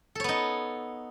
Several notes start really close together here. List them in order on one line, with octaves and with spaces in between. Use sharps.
A4 C#5 B3 D#4